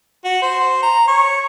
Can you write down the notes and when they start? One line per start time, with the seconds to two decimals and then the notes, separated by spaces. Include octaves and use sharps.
0.25 F#4
0.42 C5
0.82 A#5
1.07 C#5